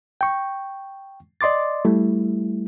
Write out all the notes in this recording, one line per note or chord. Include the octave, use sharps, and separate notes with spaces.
G5 C#6
D5 D#5 C6 D6 A6
G3 A3 E4